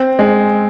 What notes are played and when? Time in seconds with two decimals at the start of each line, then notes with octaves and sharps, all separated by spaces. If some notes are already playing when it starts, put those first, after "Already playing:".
Already playing: C4
0.19 G#3